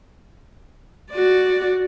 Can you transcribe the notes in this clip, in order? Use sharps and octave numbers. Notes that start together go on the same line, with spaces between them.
F#4 D5